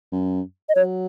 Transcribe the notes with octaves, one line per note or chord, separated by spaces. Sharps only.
F#2
D#5
F#3 C#5